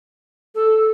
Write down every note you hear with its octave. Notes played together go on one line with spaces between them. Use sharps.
A4